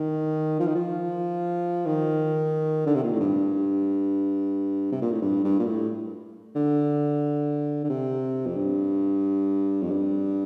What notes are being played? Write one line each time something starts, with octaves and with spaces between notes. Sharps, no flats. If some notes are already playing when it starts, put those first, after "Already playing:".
Already playing: D#3
F3
D#3
F3
D#3
D3
C3
A#2
A2
G2
C3
A#2
A2
G2
G2
A#2
A2
D3
D3
C3
F2
G2
F2
G2